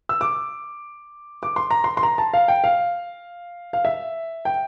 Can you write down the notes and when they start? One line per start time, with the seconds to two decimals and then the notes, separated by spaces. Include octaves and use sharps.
0.09 E6
0.21 D6
1.43 D6
1.56 C6
1.71 A#5
1.84 C6
1.97 C6
2.03 A#5
2.18 A5
2.33 F5
2.48 G5
2.64 F5
3.73 F5
3.85 E5
4.45 G5